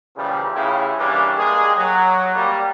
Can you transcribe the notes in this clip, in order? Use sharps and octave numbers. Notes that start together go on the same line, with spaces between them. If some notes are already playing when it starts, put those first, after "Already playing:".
A#2 C#3 E3 F3 G3
A2 C#3 E4 F4 G4 G#4
E3 G3 A#3 C#4 D4
G#3 A#3 G4 G#4
F#3
G3 A#3